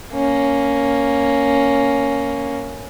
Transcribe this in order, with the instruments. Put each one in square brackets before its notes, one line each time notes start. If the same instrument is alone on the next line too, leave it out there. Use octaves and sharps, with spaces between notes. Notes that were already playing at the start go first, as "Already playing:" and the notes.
[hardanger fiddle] A#3 C#4